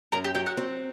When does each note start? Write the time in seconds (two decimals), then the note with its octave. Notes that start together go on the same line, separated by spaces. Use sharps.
0.12 F#2 A#4 A#5
0.24 G4 G5
0.34 F#3 G4 G5
0.46 F#4 F#5
0.57 C4